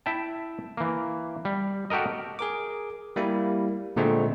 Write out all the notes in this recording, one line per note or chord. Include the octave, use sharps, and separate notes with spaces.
E4 E5 G5 A5
E3 A#3
G3
F#4 G4 A4 A#4 D#5
G#4 A#4 D6
G3 A#3 E4
A#2 D3 G#3 A3 C4